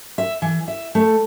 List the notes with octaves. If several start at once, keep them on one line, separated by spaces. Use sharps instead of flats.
E5
E3
E5
A3